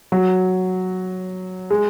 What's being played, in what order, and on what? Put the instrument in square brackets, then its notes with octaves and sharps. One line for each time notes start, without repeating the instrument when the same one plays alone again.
[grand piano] F#3
G#3